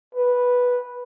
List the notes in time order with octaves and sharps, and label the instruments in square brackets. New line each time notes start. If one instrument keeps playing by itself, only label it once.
[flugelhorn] B4